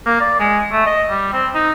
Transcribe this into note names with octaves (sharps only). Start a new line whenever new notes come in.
A#3
D5
G#3
A3
D#5
G3
C4
D#4